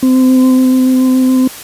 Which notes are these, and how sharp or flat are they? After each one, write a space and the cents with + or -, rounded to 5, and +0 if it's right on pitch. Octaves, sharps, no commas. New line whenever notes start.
C4 -25